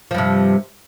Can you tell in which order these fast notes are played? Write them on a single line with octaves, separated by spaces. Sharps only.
F3 G2 C3